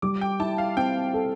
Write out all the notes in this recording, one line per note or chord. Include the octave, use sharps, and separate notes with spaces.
G3 D6
G5
E4 A5
F5
C4 G5
A4